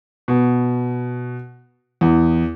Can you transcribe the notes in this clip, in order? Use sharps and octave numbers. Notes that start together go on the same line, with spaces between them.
B2
E2